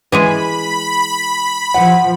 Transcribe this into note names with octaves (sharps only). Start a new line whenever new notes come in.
E3 G#3 G#4 B5
F3 F#5